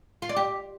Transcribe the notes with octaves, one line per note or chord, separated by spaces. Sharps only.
F4
D5
G4